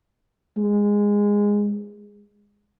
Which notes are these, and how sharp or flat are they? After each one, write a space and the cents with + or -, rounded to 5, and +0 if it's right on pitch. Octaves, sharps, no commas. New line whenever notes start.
G#3 -15